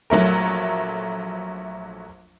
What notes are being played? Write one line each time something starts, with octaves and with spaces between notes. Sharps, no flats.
A#1 F#3 A3 A#4